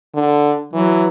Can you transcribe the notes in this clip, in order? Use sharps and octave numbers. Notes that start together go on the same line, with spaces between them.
D3
E3 F#3